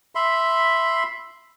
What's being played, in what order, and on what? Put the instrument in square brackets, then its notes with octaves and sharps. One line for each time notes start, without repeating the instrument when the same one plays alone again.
[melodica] E5 B5 C6